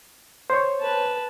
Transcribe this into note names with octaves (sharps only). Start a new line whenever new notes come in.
C5 C#5
B4 A5